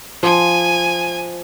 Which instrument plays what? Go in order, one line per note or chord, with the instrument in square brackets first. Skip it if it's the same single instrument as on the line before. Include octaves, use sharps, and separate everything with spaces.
[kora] F3 [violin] G#5